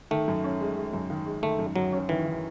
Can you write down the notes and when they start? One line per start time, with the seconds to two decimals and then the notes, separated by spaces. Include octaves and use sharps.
0.11 D#3 A3
0.28 F#2
0.44 C#4
0.61 G#3
0.77 G#3
0.93 F#2
1.10 D#3
1.26 G#3
1.43 D#3 A3
1.59 F#2
1.76 F#2 F#3
1.92 C#4
2.09 D#3 E3
2.26 D#3